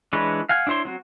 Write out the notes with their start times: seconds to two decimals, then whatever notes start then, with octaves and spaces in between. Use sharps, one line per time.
0.13 E3 G#3 D4 B4 C#5
0.49 F5 F#5 G#5
0.67 D4 E4 C5 C#5 C6
0.85 F#3 C4 F#4